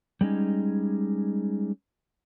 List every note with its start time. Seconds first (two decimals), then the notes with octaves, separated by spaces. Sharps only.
0.21 G3 G#3 C#4 D#4